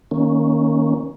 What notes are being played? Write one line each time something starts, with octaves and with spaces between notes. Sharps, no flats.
D#3 A#3 C#4